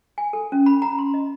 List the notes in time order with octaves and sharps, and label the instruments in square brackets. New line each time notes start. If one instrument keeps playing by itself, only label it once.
[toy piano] G#5
A4
C#4
B5
A#5
C6
D#5